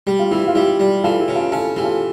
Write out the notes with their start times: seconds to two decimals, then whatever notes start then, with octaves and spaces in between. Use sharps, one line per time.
0.07 G3 G4
0.19 F4
0.31 E3 E4 G4
0.48 F4
0.55 G3 E4 G4
0.79 G3
1.04 E3 F4 A4
1.20 E4 G4
1.28 C#3
1.36 F4 A4
1.52 C#4 F4 A4
1.76 E3 G4
1.84 F4 A4